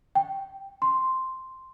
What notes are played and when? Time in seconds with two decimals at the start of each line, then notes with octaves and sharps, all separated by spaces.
0.15 G5
0.82 C6